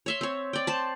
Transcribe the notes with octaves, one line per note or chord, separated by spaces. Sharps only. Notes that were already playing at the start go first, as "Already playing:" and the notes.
C#5 E5 C6
C4 C#5
D5 G5
C5 A5